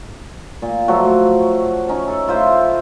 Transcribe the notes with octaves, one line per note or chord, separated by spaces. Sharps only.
A#2
F3 F#3 A3 F#4
C#4 D#4
A4
E4 F4 C5 E5